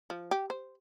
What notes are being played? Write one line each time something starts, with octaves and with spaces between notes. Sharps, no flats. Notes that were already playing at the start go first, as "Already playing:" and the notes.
F3
G4
C5